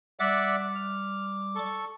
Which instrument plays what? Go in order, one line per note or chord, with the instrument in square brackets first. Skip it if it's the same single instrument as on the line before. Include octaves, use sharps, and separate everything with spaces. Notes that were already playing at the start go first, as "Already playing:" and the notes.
[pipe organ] G3 D6 [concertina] D5 E5 F#5
[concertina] F6
A4 C#6